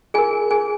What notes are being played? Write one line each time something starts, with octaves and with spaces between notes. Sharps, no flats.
F4 G#4 A#4 G#5
G#4 G#5